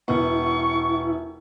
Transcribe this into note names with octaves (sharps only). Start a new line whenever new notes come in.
E1 B3 E4 C#6